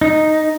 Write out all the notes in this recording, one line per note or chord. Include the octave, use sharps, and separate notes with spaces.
D#4